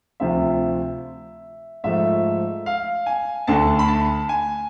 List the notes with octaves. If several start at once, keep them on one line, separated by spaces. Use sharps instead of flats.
D2 C3 F3 E5
G#2 F3 A3 E5
F5
G#5
D2 D3 A3 A5
B5
A5
G#5